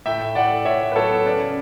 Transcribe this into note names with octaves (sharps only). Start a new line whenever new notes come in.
A2 E5 G5
A2
A2 D5 F#5
A2
A2 C#5 E5
A2
B4
F#3 A4 C#5
B3
C#4 B4 D5
C#3